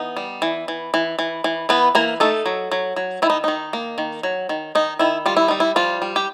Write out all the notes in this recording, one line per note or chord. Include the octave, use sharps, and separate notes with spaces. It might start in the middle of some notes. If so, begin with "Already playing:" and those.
Already playing: E3 B3 D#4
G3
E3
E3
E3
E3
E3
E3 B3 B4
E3 A#3 A#4
A3 D#4 A4
F#3
F#3
F#3
D#3 E4
D#4
D#3 D#4
A#3
D#3
F#3
D#3
D#3 D#4
D#3 E4
G3 F4
E4
G3 D#4
E4
F3 G3 F4
G3
G4